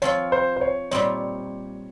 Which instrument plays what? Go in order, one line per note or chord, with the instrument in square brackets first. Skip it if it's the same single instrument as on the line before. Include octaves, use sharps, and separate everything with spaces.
[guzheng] F3 C4 F4 [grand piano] C#5
[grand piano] C5
C5
C#5
[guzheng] A#2 G3 C4 D#4 [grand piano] C#5